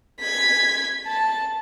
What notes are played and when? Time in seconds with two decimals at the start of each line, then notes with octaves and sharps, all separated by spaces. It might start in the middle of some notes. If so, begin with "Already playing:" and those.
0.20 G#6 B6
1.06 A5